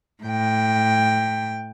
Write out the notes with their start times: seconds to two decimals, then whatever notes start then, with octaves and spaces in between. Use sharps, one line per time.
0.24 A2 G5